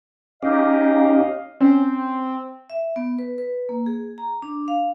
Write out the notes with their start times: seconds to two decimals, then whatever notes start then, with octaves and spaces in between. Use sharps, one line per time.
0.43 C#4 D#4 G4 D#5 F5
1.61 C4 C#4
2.70 E5
2.96 B3
3.19 B4
3.38 B4
3.69 A#3
3.86 G#4
4.18 A#5
4.42 D4
4.68 F5